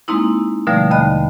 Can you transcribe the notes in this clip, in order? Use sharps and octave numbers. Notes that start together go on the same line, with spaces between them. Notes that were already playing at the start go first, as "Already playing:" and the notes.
G#3 A#3 C4 D#4 E4
B2 D3 F3 G3 A3
D#2 D3 A3 D#5 B5 F#6